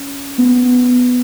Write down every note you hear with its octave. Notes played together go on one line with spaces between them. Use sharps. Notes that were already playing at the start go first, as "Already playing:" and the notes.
Already playing: C#4
B3